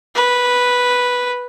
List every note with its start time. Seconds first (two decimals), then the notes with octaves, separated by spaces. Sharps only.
0.15 B4